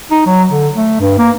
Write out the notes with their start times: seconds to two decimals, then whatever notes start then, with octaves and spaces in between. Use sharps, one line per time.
0.11 D#4
0.26 F#3
0.49 D3
0.75 A3
1.00 G2
1.18 A#3